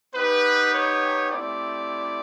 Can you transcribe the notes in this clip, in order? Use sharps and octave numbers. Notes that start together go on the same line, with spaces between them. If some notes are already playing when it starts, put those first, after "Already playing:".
B3 D#4 G4 B4
C#5
A3 C4 E4 G4 D5